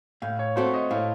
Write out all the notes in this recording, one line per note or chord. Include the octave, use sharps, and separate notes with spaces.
A2 F5
C#5
A3 C4 F#4 C5
D#5
A2 F5